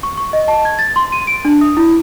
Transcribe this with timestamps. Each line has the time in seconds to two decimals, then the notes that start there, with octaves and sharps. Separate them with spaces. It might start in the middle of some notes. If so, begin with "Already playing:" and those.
0.03 C#6
0.17 C#6
0.33 D#5
0.48 A5
0.65 G#6
0.79 A6
0.96 C6
1.12 D#7
1.27 D7
1.45 D4
1.61 D#6
1.77 E4